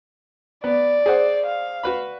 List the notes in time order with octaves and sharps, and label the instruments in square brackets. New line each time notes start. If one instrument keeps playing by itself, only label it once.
[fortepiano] B3 [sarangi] D5
[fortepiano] G#4 C5 F#5
[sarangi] F5
[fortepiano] F#4 B4 B5